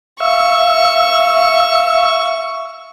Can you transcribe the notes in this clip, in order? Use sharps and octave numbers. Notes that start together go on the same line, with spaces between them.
E5 F5 C#6 E6